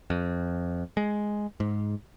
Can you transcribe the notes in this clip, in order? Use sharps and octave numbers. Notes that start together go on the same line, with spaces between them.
F2
G#3
G#2